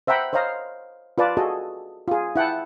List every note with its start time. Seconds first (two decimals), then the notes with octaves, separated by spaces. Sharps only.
0.07 C5 E5 F#5 G5 A#5 B5
0.33 C5 C#5 D#5 F5 A#5
1.18 F4 B4 D5 A5
1.37 F#4 G#4 A4 D#5
2.08 F4 G#4
2.36 E4 F#5 G5 A5